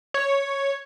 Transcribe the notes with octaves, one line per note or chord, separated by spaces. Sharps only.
C#5